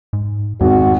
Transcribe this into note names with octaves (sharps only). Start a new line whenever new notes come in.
G#2
G#1 E2 F#4